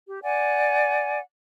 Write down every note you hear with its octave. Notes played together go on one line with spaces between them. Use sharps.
G4
D5 F#5 G#5